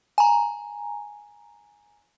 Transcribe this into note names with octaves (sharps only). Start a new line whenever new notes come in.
G#5 A#5